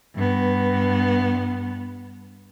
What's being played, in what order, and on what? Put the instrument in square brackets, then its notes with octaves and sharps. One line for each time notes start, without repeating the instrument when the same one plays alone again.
[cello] G2 B3